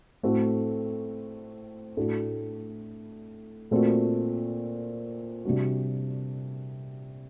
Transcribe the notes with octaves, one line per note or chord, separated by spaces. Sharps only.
A2 A3 C4 F#4
A2 A3 D4 F#4
A#2 A3 C4 F#4
C3 G3 D4 F#4